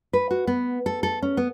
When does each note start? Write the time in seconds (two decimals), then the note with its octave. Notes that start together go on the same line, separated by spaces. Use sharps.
0.13 B4
0.31 F#4
0.47 B3
0.86 A4
1.03 A4
1.22 C#4
1.37 B3